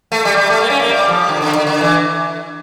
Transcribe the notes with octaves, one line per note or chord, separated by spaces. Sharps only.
A3
G3
G3
A3
A#3
C#4
A#3
G3
F3
D3
D3
D3
D3
E3